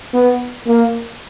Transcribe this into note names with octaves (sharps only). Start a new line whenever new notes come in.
B3
A#3